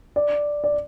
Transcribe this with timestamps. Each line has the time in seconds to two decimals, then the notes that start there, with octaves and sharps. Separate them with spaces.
0.16 D5
0.64 D5